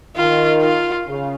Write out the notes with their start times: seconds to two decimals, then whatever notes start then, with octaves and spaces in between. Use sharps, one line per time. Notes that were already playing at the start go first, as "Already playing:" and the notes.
0.16 D#3 F4
0.62 F4
1.07 C#3